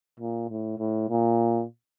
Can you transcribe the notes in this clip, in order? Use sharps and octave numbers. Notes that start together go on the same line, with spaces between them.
A#2
A2
A2
A#2